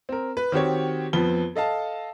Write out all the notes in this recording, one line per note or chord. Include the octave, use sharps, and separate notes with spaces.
C4 A#4
B4
D#3 C4 F#4 G4 C#5
F2 F3 B3 B4 G7
A4 D#5 F5 A5